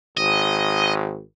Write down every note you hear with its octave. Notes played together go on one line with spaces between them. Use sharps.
G#1 D#5